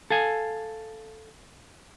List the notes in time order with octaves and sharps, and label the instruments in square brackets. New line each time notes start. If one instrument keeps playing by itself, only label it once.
[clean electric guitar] A4 F5 G#5